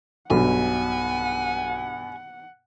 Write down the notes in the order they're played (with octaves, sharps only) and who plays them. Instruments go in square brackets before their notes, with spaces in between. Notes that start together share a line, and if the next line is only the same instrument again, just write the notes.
[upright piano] B1 [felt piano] G2 B2 [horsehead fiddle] F#5 [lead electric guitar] G#5